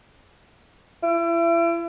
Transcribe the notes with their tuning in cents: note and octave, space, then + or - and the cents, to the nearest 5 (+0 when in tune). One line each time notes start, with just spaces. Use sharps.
E4 +35